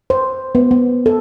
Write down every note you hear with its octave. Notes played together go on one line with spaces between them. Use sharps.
C5
B3
B3
A4